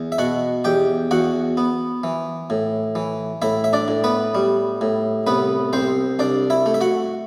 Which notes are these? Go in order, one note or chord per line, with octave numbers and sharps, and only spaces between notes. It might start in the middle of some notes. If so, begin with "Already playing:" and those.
Already playing: E2
E5
B2 F#4 F#5
E2 G4 G5
E2 F#4 F#5
B3
E3
A2
E3
A2 E4 E5
E5
D4 D5
A2
B3 B4
G3
A2
C2 B3 B4
C2 C4 C5
C2 D4 D5
E4 E5
A3
E5
F#4 F#5